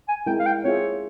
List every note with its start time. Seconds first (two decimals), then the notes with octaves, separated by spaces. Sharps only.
0.08 G#5
0.26 G#3 C4 E4 A#4 G5
0.39 F5
0.46 G5
0.64 C4 F4 G#4 C#5 E5